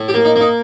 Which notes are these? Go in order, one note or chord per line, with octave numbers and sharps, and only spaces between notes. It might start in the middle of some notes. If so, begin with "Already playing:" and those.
Already playing: A2
G4
A#3
D#4
A#3
D#4